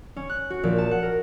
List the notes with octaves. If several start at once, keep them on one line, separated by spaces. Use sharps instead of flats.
C#4
F#6
F#4
A#1
A5
F#5
A#4